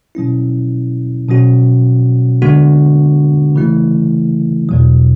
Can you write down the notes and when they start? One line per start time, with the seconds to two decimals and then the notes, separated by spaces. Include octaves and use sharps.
0.15 B2 F#3 C#4 E4
1.28 B2 F#3 C#4 F#4
2.42 D3 G#3 B3 D4 F#4
3.56 C#3 E3 A3 E4
4.69 E2 B2 F#3